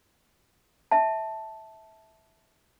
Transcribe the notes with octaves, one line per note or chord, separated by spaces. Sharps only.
E5 A5